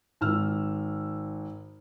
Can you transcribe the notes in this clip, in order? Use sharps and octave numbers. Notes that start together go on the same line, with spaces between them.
G#1 E6 F6